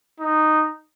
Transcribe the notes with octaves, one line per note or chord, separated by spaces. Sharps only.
D#4